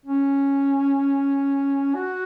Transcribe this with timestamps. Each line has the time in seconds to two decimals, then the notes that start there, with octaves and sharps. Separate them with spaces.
0.06 C#4
1.95 F#4